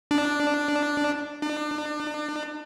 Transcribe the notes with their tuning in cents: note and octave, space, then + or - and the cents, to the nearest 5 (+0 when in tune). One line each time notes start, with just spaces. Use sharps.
D4 +0
D4 +35